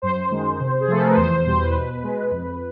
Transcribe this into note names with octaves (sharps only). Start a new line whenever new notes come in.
F#2 C5
D#3 G#3
C3
G#4
F3 A3 A4
A#4
B4
E2 C5
B2 G3 C5
B4
B2
G#3
F2